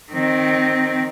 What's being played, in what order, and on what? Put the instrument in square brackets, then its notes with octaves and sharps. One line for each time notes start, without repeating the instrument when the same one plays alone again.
[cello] D#3 C4